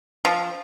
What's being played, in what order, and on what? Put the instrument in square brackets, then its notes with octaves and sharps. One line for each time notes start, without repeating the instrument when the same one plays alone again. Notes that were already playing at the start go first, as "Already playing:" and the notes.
[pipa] F3